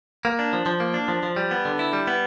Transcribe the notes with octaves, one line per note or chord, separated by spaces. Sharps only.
A#3
D4
F3
F3
A#3
D4
F3
F3
G3
B3
D3
E4
G3
B3